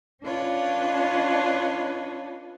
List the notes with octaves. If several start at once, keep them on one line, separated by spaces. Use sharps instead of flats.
C#4 D4 F4 B4 C#5 D#5